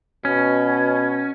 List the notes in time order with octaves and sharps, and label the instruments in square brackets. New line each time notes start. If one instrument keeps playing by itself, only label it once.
[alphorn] B2 [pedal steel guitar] C#4